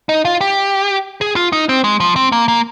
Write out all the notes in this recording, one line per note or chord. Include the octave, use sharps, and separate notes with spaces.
D#4
F4
G4
G#4
F4
D#4
C4
G#3
F3
C4
A#3
A#3